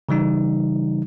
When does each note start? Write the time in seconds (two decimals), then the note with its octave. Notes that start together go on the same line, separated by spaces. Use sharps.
0.09 C#3 E3 G3 D#4